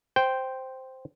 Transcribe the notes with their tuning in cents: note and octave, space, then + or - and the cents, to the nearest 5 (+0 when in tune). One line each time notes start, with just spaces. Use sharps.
C5 +0 G5 -5